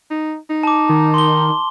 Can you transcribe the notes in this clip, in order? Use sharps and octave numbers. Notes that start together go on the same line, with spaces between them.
D#4
D#4
A5 D6
D#3
C6 G7